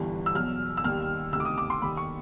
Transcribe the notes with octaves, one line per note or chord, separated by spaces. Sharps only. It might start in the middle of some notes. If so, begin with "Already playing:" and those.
Already playing: G1 G2 E3 G3
E6
E2 B2 F#3 F6
E6
D#2 D#3 G3 F6
D2 C3 D#3 E6
D6
D#6
D6
C6
D#2 D#3 G3 B5
C#6